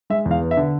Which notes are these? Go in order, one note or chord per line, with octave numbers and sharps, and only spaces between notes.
G#3 E5
E2
F5
B3
E5
D3